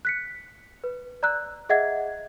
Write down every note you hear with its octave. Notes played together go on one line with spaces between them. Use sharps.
F#6 B6 C#7
B4
D5 A#5 E6 F#6
G#4 D#5 E5 F#5 G#6